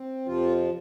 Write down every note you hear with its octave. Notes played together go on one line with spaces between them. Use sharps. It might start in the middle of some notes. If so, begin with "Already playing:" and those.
Already playing: C4
F2 C3 F3 F4